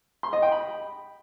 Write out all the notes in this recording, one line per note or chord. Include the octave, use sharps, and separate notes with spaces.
C6
D#5
G5
B5